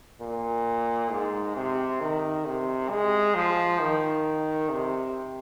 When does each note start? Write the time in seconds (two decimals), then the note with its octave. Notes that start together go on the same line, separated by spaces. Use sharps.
0.21 A#2
1.11 G#2
1.56 C3
2.00 D#3
2.45 C3
2.90 G#3
3.35 F3
3.79 D#3
4.70 C3